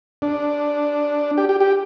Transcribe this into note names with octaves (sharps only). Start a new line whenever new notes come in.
D4
G4
G4
G4